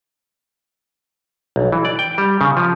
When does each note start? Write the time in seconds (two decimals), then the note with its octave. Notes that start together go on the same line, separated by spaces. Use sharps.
1.56 B1
1.72 E3
1.85 D5
1.99 G5
2.18 G3
2.41 C#3
2.57 F3